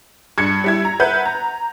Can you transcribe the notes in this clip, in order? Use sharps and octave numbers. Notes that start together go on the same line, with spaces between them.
G2 G#6 C#7
G3 E4 G#6
A#5
B4 E5 F#5 G6
A#5